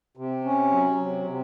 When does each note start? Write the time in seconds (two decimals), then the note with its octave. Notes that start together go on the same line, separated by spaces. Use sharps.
0.17 C3
0.44 C#4
0.71 F#3
0.99 C3
1.27 C3